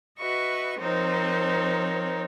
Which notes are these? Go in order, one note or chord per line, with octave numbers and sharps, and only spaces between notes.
F#4 B4 D#5 E5 C#6
F3 C4 D#4 A#4 C5 C#5